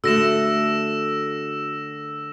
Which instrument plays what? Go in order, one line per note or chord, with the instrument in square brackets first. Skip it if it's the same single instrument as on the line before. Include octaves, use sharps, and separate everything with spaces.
[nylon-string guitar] D3 A3 [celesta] F#4 A4 [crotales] E6 A#6 E7